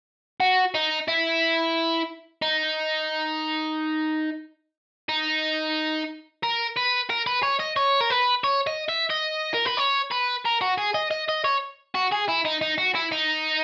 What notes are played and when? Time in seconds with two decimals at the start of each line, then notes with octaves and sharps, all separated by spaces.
0.40 F#4
0.74 D#4
1.08 E4
2.42 D#4
5.09 D#4
6.43 A#4
6.77 B4
7.10 A#4
7.27 B4
7.43 C#5
7.60 D#5
7.76 C#5
8.01 A#4
8.10 B4
8.44 C#5
8.67 D#5
8.89 E5
9.10 D#5
9.54 A#4
9.65 B4
9.77 C#5
10.11 B4
10.45 A#4
10.61 F#4
10.78 G#4
10.94 D#5
11.11 D#5
11.29 D#5
11.44 C#5
11.95 F#4
12.12 G#4
12.28 E4
12.45 D#4
12.61 D#4
12.78 F#4
12.95 E4
13.12 D#4